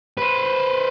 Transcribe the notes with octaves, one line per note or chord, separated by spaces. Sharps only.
B4 C5